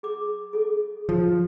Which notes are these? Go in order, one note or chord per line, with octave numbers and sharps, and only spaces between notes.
G#4 D6
G#4 A4
F3